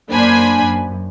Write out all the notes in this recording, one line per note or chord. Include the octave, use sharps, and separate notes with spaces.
F#2 A#3 D4 C5 G#5 B5
F#2